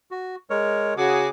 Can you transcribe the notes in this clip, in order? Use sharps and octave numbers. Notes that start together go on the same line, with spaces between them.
F#4
G#3 A#4 C#5
C#3 F#4 G#4 D6